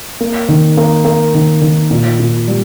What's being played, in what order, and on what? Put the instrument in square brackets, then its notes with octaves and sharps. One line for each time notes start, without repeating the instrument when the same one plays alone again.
[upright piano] A#3
D#3
A#3
A#3
D#3
D#3
A#2
A#2
G3